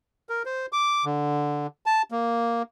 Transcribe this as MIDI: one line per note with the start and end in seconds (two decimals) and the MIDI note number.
0.29 0.43 70
0.46 0.66 72
0.72 1.05 86
1.05 1.67 50
1.86 2.02 81
2.11 2.62 58